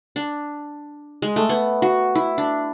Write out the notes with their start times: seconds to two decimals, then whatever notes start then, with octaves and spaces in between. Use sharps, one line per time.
0.16 D4
1.22 G#3
1.36 A3
1.49 B3
1.82 F#4
2.15 E4
2.38 D4